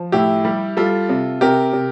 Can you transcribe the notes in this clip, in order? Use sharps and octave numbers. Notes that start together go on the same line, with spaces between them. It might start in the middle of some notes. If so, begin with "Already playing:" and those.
Already playing: F3
A2 E4 G4
G3
G3 F4 A4
C3
C3 G4 A#4
C3